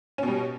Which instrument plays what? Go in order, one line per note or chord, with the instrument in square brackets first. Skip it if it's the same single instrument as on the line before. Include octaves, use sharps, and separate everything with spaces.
[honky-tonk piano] C#4
B2
G3